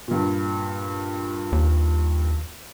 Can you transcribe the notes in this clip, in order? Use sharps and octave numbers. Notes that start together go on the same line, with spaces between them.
G2 A#2
D#2